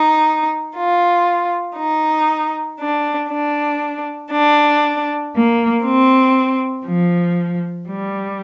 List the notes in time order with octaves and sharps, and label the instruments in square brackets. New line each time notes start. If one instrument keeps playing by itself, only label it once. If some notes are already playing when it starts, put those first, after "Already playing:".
Already playing: [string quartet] D#4
F4
D#4
D4
D4
D4
A#3
C4
F3
G3